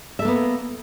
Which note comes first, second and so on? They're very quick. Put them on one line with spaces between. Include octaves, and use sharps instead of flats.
E5 A4 A#3 B3